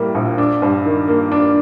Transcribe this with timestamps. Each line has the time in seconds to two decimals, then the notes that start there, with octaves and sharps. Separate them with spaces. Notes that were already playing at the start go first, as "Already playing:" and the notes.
Already playing: A2 G3 A#3
0.15 A#1
0.38 D4
0.62 G2
0.85 D#3
1.08 A#3
1.32 D4